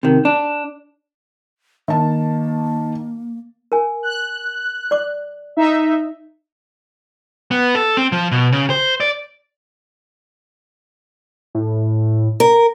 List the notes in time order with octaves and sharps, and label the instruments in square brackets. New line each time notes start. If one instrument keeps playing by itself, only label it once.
[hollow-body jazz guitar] C3 D#3
D4
[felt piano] D#3 A5 [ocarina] A#3
[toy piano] A#4 G#5
[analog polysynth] F#6
[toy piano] D5 D6
[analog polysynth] D#4 E5
[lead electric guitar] B3
A4
C4
F3
B2
C#3
C5
D5
[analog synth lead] A2
[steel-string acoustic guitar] A#4